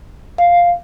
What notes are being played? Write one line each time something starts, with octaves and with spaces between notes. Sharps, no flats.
F5